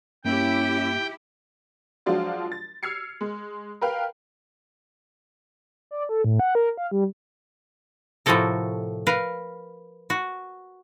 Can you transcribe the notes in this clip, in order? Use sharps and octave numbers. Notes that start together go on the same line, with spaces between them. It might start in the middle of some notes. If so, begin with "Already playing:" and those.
G2 A#3 C#4 E4 G4 G5
F3 F#3 G#3 D4 F4 F#4
A6
E6 F6 G#6 C7 C#7
G#3
A#4 B4 F5 G5
D5
A4
A2
F#5
A#4
F5
G3
A2 C3 F3 F#4 A4 A#4
A#4 B4 F5
F#4